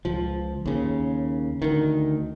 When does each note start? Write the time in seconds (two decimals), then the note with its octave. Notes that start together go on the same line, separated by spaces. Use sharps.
0.05 C#2 F3
0.66 D#2 C#3
1.62 D2 D#3